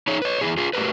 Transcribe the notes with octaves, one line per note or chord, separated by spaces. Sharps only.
D#4 G#4 C#5
B4 C#5
E2 C3 E4 G#4
F4 G#4
A3 F#4 G4 A#4 B4